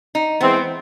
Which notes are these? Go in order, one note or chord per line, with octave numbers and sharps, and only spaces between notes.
D#4
E3 G#3 B3 C4